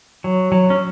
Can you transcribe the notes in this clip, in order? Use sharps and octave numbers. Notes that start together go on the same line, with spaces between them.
F#3
F#3
C#4